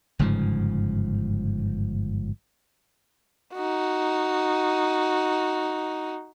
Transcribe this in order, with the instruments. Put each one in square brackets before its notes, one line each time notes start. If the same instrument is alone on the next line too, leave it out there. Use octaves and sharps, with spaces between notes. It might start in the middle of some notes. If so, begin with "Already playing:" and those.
[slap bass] G1 G#2 C#3 F3
[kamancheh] D#4 F#4